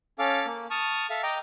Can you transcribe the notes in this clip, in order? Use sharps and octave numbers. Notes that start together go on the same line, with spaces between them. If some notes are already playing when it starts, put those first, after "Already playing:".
C#4 A4 F5 D6
A#3
A5 C#6 D#6 F6
A4 E5 F5
D#5 G5 A#5 D6